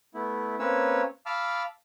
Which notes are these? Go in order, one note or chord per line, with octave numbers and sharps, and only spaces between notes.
A3 B3 E4
A#3 C4 C#4 B4 C#5 E6
F5 A5 B5 D6 E6 F6